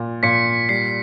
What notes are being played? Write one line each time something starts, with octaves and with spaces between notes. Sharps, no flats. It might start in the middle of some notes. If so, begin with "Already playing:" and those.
Already playing: A#2
A#2 B6 C#7
G3 C7